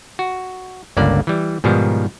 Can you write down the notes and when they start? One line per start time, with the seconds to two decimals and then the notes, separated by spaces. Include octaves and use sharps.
0.19 F#4
0.97 G1 C#2 G2 A#3 D5
1.27 E3 G3
1.64 G#2 B2 D#3 F3 G3